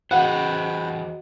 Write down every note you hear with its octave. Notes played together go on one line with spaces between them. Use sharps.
E3 F#4 G#4 B4 C5 D#5 F#5 G5